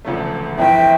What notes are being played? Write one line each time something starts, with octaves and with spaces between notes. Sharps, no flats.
E1 D2 C#3 F3 A3
G1 F2 E3 E5 G5